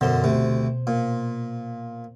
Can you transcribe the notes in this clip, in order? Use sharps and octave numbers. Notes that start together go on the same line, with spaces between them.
F#2 B2 D3 C5
D2 C3
A#2